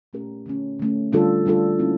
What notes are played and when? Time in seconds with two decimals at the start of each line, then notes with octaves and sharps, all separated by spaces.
0.13 A#2 A3 C#4 G4 A#4
0.46 D3 A3 C#4
0.80 D3 A3 C#4
1.12 D3 G3 D4 F4 A4
1.46 D3 G3 D4 F4 A4
1.79 F3 A#3 C#4 E4